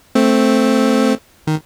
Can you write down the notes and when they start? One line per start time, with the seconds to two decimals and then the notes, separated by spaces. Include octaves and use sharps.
0.15 A3 C4
1.47 D#3